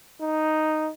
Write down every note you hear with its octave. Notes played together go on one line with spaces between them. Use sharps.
D#4